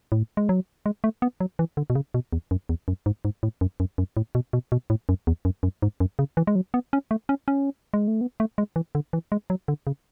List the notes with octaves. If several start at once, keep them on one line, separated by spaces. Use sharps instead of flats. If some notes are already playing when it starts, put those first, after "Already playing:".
A2
G#3
F#3
G#3
A3
B3
F#3
E3
D3
B2
C#3
B2
E2
F#2
E2
F#2
G#2
G#2
A2
F#2
F#2
F#2
A2
B2
B2
B2
A2
F#2
E2
F#2
F#2
G#2
F#2
C#3
E3
G#3
F#3
B3
C#4
A3
C#4
C#4
G#3
A3
B3
A3
G#3
E3
D3
E3
G#3
F#3
D3
C#3